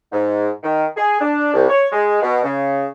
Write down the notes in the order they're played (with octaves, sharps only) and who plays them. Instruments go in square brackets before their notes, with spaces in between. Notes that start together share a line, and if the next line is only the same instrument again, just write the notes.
[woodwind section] G#2
D#3
G#4
D4
C2
C#5
G#3
B2
C#3